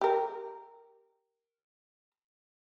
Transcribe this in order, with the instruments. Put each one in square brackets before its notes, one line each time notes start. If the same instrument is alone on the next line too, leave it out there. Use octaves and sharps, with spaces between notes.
[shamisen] G4 A#4